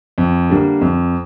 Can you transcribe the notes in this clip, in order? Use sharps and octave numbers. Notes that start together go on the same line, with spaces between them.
F2
D3 G3 A#3
F2